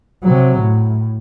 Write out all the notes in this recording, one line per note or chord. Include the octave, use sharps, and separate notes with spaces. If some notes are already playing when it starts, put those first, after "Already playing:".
C3 F#3
A2